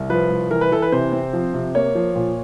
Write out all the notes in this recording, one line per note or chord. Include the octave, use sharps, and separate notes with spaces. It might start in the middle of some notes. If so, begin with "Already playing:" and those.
Already playing: C2
F3 B4
C2
E3 A#4
B4
E3 A4
B4
C3 C5
C4
F3
C3
A#3 C#5
F3
A#2